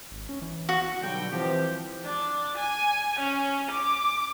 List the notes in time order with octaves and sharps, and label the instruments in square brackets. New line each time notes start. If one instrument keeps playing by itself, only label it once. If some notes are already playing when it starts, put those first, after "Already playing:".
[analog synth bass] G#1
C#4
E3
[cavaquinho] F#4
[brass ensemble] B1 D3 G3 G5
E3 F3 C4 G4
[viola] D4
G#5
C#4
D6